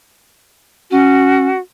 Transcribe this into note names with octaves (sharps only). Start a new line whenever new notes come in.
C#4 F#4